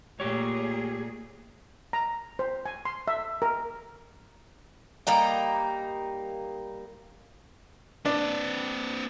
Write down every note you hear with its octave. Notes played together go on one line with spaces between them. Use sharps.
A#2 A3 G4 G#4 C#5
A#5
C5
G#5
C6
E5
A#4
G3 A#3 D#4 G5
C4 D4 B4